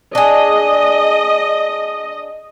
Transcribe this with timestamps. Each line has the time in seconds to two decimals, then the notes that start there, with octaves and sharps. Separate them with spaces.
0.15 D4 G#4 D#5